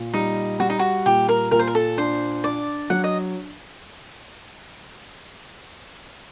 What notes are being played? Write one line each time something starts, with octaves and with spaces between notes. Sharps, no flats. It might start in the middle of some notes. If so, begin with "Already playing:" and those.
Already playing: A#2
G3 D#4
G3 F#4
D#4
F#4
A#2 G4
A#4
A#2 A#4
C5
A#4
A4
D4 C5
D4 D5
F#3 F#5
D#5